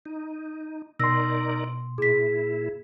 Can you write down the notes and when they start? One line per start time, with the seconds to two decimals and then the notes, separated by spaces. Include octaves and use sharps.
0.06 D#4
0.99 B2 D#4 A#4 D5 C6 E6 A#6
1.98 A#2 E4 G#4 B6